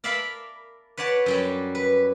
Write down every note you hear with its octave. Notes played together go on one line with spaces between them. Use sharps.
A#4 D5 E5 F5 A5 B5
B4 C#5 D5 F#5 A5
F#2 F#3 G3
B4